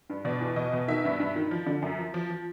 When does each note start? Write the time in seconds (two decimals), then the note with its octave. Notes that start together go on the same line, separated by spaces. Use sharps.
0.10 G2
0.25 B2 D5
0.41 E2
0.56 B2 D#5
0.73 B2
0.88 D#3 E5
1.05 G2
1.20 G2
1.36 D#3
1.51 F3
1.66 D3
1.82 F#2
1.98 F3
2.14 F3
2.30 F3